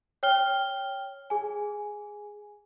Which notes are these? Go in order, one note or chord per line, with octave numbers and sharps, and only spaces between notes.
C#5 G5 F6 G7
G#4 G#5